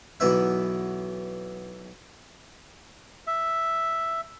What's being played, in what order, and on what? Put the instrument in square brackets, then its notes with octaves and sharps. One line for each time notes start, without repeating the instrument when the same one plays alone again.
[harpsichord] B1 E3 B3 E5
[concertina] E5